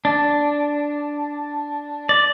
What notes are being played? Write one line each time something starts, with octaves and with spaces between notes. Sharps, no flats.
D4
D5